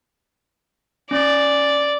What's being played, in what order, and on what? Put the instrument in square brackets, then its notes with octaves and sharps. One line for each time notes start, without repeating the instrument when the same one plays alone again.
[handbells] C#4 [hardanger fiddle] D5